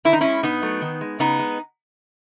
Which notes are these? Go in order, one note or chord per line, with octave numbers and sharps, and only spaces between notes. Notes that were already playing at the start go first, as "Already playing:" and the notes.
D#3 E4
D#4
G#3 C#4 E4
B2 B3 D#4
F#3 A3
D#3
G#3
C#3 B3 D#4
G#3